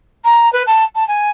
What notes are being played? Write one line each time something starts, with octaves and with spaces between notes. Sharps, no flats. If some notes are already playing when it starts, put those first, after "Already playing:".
A#5
B4
A5
A5
G#5